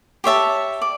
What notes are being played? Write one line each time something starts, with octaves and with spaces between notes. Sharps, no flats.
G4 C#5 E5 A5
D5